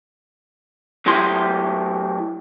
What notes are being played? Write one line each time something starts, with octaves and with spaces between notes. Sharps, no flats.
A2 F#3 E4 G4 C6